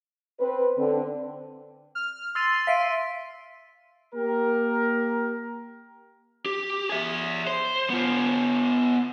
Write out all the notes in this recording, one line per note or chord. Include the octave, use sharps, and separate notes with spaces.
C4 B4 C5
D3 C4
F6
C6 E6 A6 D#7
E5 F5 B6 D7 D#7
A#3 G4 A#4
G4
G#4 E5
C5
B3 F4